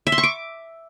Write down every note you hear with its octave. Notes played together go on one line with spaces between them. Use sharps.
E5
C6
C#6
D6